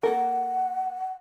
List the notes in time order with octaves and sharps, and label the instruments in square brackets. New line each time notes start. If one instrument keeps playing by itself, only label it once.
[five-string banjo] A#3 A4 A#4 [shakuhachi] F#5